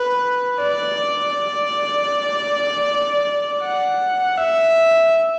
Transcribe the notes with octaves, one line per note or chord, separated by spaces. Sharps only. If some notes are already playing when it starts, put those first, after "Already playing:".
Already playing: B4
D5
F#5
E5